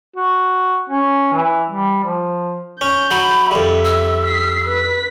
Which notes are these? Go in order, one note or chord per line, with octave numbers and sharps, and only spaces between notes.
F#4
C#4
E3
G3
F3
C#4 G6
F#3 B5
F2 G3 E5
E6
B6 C7
B4 B6